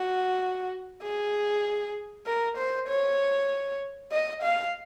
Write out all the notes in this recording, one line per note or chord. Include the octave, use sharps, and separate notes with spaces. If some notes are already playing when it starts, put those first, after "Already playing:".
Already playing: F#4
G#4
A#4
C5
C#5
D#5
F5